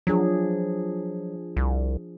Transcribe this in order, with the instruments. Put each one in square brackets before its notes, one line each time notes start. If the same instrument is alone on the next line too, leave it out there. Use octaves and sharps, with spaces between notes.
[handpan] F3 D4 G#4 [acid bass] F#3
[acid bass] C2